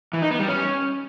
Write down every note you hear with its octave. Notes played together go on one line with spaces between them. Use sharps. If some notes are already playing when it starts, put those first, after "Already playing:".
E3
D#4
B3
G3
C#4